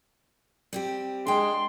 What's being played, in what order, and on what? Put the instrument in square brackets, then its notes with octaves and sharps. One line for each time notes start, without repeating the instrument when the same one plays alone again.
[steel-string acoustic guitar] G3 C4 G4
[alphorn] G#3 [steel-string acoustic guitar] D4 G5 [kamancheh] C6